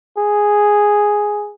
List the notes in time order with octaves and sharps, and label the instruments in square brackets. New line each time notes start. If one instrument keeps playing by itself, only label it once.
[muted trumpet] G#4